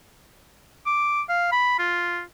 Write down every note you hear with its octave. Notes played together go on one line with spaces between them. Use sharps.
D6
F5
B5
F4